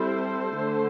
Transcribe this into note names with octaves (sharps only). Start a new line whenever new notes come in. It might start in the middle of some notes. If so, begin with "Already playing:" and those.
Already playing: G3 C4 E4 A4 C5
D3 A3